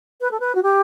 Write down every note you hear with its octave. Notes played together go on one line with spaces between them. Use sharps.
B4
A4
B4
F#4
G4